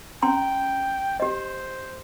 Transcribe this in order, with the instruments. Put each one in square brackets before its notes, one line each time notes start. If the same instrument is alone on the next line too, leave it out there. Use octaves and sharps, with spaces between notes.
[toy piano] C#4 A#5 C6 [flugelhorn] G5
[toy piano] G4 D#5 [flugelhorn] C5